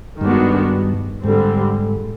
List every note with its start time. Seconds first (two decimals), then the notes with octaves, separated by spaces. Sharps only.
0.21 G2 D#3 G3 G#3 B3 D4 F#4
1.24 G#2 D3 G3 G#3 C4